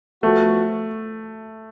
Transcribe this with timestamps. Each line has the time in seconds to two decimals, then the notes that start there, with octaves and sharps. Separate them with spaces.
0.23 F3 A3 B3 F#4